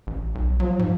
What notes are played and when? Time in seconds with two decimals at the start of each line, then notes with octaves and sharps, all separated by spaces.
0.07 A1
0.35 B1
0.60 F3 F#3
0.79 G#2